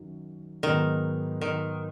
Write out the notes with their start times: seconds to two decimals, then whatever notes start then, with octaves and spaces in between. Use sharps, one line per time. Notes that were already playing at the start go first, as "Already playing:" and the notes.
Already playing: F#2 D#3 F#3
0.63 G#2 D#3 F#3 B3 D#4
1.41 D#3